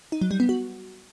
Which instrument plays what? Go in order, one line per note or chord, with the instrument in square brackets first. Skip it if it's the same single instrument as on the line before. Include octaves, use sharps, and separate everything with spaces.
[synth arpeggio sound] D#4
F#3
G3
B3
F#4